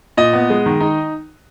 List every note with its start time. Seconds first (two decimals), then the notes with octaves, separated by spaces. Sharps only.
0.17 A#2 D#5
0.33 B3
0.50 G#3
0.66 D#3
0.80 D#4